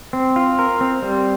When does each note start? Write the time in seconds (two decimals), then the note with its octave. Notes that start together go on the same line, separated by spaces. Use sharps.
0.13 C4
0.36 F4
0.59 A#4
0.81 C4
1.02 G3